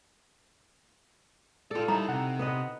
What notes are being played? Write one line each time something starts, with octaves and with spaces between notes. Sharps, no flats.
F4 G4 A4 D5
G3 D#4 E4 A#4 E5 A#5
C3 F#5
B3 B4 D#5